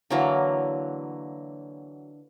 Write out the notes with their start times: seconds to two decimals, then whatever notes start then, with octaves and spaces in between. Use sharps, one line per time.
0.10 D3 E3 F#3 A#3